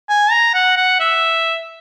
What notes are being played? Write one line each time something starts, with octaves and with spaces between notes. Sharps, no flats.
G#5
A#5
F#5
F#5
E5